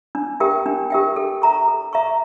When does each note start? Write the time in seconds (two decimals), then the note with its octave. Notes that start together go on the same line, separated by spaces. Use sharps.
0.15 D4
0.40 G4 A#4 E5 G5
0.66 D4
0.90 G4 A#4 E5 G5
1.16 A4
1.42 E5 A#5 C#6
1.68 A4
1.93 E5 A#5 C#6